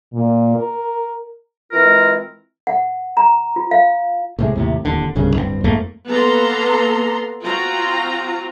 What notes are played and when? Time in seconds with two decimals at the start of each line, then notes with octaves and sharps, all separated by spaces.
0.14 A#2
0.56 A#4
1.73 E3 G#3 C4 F4 A#4
2.67 F#5
3.17 A#5
3.56 F4
3.71 F5
4.39 A2 C3 G#3
4.55 D#2 A2 C3
4.85 D1 D#2 D3
5.15 G1 C2 G2 C#3
5.34 D1 G2 A#3 C4
5.64 F2 G#2 A3 A#3
6.07 A#3 B3 A4 A#5 C6
7.43 C4 F4 F#4 A#5